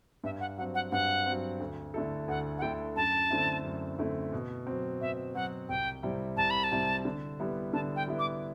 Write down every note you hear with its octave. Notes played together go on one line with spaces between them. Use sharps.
G2 E5
F#5
F#3 C4 F#5
F#5
G2 F#5
F#3 C4
D2
D3 A3 E4 A4
D2 F#5
F#5
D3 A3 E4 A4 G5
F#2 A5
D3 A3 C4 E4
F#2
D3 A3 C4 E4
B2
F#3 C4
B2 E5
F#3 C4 F#5
C2 G5
C3 G3 C4 E4
C2 A5
B5
A5
C3 G3 C4 E4
D3
G3 B3 E4
D3 A5
G5
G3 B3 E4
D6